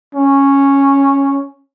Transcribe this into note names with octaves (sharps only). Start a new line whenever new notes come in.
C#4